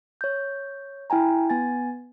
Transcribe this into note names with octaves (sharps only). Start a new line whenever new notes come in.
C#5 G6
E4 G5 G#5 A#5
B3 G#5 A6